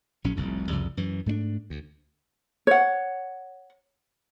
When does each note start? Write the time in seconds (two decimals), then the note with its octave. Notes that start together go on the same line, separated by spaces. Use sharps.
0.24 A#1 F#3 C#4
0.36 F1 C2 F2
0.69 C2 F2 C#3 G3
0.97 F#2 E3
1.26 G#2 A3 C4 D4
1.70 D2
2.67 C#5 F#5